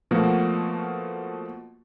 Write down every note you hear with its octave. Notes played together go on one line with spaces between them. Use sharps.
B2 F3 A3 A#3 F#4